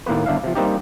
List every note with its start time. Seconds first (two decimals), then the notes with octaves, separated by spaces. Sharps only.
0.06 D#2 A2 A#3 B3 B4
0.26 G1 D4 E5 F5
0.44 C3 F3
0.55 G3 A#3 C4 D#4 G4